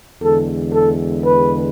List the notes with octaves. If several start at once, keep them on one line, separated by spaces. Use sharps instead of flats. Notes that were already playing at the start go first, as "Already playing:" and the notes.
E2 D3 G#3 A4
A4
B4